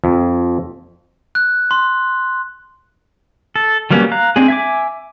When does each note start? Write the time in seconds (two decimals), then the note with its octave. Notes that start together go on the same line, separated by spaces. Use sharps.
0.04 F2
1.35 F#6
1.71 C6
3.56 A4
3.91 F#3 G3 A#3 B3 C#4
4.12 F5 A#5 F#6
4.36 G#3 C4 D4 G#4
4.48 E5 G#5 D6